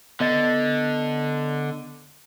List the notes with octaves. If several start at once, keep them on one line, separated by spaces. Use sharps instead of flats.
D3 B3 D#5 A6